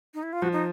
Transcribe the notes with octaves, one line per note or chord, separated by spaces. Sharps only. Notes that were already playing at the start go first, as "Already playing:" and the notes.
D#4
E4
F4
F3 F#4
D#4